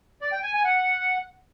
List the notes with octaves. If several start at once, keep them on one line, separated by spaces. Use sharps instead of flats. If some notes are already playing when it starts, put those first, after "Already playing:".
D5
G5
G#5
G#5
F#5